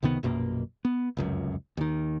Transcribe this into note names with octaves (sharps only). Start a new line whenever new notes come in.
C#2 C3 D#3 B3
A#1 F#2 B2 A#3
B3
F1 C#2 F#2
D#2 D#3